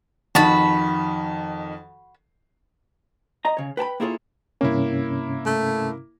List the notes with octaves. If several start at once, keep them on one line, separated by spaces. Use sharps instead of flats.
F2 D#3 F#4 A5 B5
D#5 A#5
C#3 C#5
B4 G5 A5 B5
A#3 E4 F4 G#4 A4 C#5
G2 C3 A#3 C#4 E4
A3